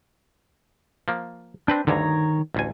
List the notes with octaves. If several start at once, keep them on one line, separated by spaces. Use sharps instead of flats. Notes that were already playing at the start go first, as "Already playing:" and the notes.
F3 A#3
C4 D4 B4 G5
D2 G2 D3 D#3 C#5 A#5
A1 D2 G#5